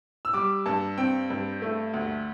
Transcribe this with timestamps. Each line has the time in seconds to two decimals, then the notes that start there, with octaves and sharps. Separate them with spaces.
0.25 E6
0.33 G3 D6
0.66 G2 A5
0.98 C4 G5
1.30 G2
1.62 A3
1.94 D2